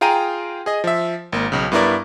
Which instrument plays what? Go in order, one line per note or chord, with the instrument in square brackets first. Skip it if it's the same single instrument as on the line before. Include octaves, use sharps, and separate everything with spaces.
[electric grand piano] F4 G#4 G5 A#5 D#7
G#4 D#5
F3 E5
G#1 A#3
B1 C#3
G2 B3 E4 A#4 D5